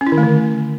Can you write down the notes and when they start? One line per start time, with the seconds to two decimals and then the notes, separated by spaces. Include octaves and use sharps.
0.01 C#4
0.07 E4
0.12 D#3
0.18 A3
0.23 D3